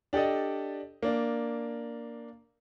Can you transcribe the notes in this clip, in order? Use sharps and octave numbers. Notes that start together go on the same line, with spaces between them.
D4 G4 A4 D5 D#5
A#3 D4